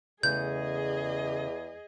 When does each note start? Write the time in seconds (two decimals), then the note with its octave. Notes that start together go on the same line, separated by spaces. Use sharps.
0.23 E2 C#3 A3 G#4 D#5 G6